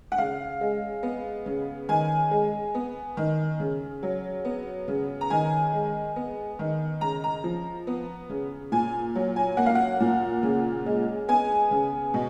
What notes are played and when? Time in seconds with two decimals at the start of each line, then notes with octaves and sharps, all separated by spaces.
0.12 F#5
0.18 C#3 F5
0.61 G#3
1.03 B3
1.46 C#3
1.89 D#3 G#5
2.31 G#3
2.75 B3
3.17 D#3
3.60 C#3
4.03 F#3
4.45 B3
4.88 C#3
5.21 A#5
5.30 D#3 G#5
5.73 G#3
6.16 B3
6.59 D#3
7.01 C#3 A#5
7.24 A#5
7.44 F3
7.87 B3
8.29 C#3
8.72 A#2 G#5
9.15 F#3
9.36 G#5
9.57 A#3 F#5
9.66 F5
9.75 F#5
10.00 A#2
10.43 C#3
10.86 G#3
11.28 B3 G#5
11.71 C#3
12.14 B2